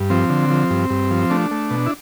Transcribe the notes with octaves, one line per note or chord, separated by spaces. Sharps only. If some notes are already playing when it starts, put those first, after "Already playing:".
Already playing: G2
F3 C4
D3
F3
G2
G2
F3
A3 D4
A3
B2
E4